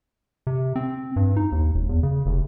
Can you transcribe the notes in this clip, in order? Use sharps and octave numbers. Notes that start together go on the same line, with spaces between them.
C3
C4
G2
D#4
D#2
E1
E2
C#3
F1